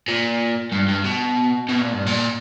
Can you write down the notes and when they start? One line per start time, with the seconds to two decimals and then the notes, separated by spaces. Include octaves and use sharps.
0.08 A#2
0.72 G2
0.88 G2
1.04 B2
1.69 B2
1.81 A#2
1.93 G2
2.07 A#2